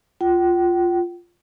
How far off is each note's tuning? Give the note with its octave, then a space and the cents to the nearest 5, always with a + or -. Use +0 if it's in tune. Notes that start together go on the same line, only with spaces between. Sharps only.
F4 +0 G5 -40